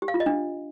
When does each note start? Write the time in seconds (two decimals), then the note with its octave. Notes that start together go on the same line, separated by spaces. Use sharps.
0.02 G4
0.08 F5
0.14 F4
0.20 D#5
0.26 D4